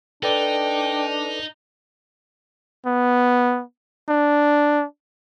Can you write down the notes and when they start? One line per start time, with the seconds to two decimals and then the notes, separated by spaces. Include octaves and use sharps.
0.23 D4 D#4 A4 B4 D5 G5
2.86 B3
4.08 D4